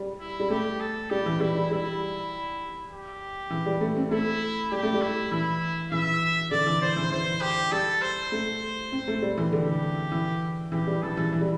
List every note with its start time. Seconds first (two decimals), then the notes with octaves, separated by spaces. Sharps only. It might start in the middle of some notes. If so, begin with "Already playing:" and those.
Already playing: G3
0.20 E4
0.40 G3
0.50 A3 G4
0.80 A4
1.10 G3 G4
1.26 E3
1.40 G3 E4
1.55 G3
1.71 G3 E4
2.90 G4
3.50 E3
3.66 G3
3.81 A3
3.97 C4
4.11 A3 E4
4.71 G3 G4
4.83 A3
4.94 G3
5.01 E4
5.32 E3 E4
5.91 E3 E5
6.51 D3 D5
6.66 E3
6.81 C5
6.96 E3
7.11 E3 C5
7.41 G4
7.72 G3 A4
8.02 C5
8.32 A3
8.92 C4
9.08 A3
9.22 G3
9.38 E3
9.52 D3 G4
10.12 E3
10.72 E3 G4
10.87 G3
11.03 E3 A4
11.17 E3
11.33 E3
11.41 G3